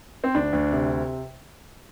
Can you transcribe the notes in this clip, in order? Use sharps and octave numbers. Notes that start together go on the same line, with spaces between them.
C4
D2 D4
D2
C3